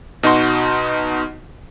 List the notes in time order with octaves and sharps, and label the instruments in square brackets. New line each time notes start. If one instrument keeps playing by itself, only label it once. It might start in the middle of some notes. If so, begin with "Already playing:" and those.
[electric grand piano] B2 D#4 F#4 C6